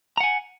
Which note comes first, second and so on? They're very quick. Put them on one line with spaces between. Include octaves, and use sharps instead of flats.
A#5 F#5 G#5